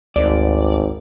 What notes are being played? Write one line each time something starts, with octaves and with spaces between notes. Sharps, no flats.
G#1 D2 D5